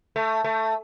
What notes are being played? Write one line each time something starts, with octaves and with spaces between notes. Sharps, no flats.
A3
A3